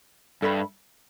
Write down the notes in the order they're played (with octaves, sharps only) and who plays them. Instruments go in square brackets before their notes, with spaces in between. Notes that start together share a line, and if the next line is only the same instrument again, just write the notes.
[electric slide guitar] G2 [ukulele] A4 E5 B5